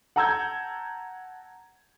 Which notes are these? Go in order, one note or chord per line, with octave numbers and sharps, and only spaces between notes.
F#5 A5 A#5 E6 G6 G#6